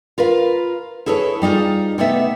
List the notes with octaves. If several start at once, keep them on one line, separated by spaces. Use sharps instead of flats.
F4 A#4 B4 F5
E4 G#4 A4 B4 C#5
G3 D#4 F4 G#4
C3 A3 B3 D#4 E5